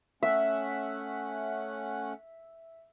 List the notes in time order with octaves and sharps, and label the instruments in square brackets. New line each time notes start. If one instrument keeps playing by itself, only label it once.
[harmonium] A3 C#4 F#5 [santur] E5